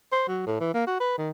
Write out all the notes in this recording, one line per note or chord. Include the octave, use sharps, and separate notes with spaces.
C5
F#3
A2
E3
A#3
F#4
B4
D#3